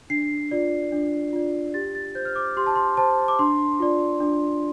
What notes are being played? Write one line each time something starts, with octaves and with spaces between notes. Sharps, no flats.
D4 C7
F4 D5
D4
F4 D5
G4 A6
A6
C5 G6
F6
D6
G4 C6
A5
C6
C5 A5
D6
D4 C6
F4 D5
D4